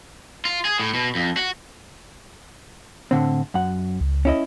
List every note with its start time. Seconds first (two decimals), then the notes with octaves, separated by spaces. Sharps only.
0.45 F4
0.65 G#4
0.80 A2
0.94 B2
1.15 F2
1.37 F#4
3.11 A2 D3 C4
3.54 F#2 F#5
4.01 C#2
4.25 C#4 E4 D#5